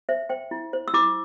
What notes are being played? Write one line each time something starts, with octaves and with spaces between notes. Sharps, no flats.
C5 E5
C5 G5
E4
C5
E6
E4 D6